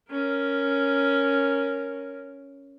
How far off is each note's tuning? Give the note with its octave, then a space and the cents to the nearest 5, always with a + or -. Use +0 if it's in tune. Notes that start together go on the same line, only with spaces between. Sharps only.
C#4 +0 A#4 +0